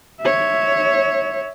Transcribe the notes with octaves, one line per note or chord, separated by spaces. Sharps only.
C#5 E5